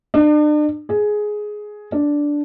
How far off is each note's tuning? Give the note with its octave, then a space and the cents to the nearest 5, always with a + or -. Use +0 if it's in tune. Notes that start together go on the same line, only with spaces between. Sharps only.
D4 +40
G#4 +10
D4 -5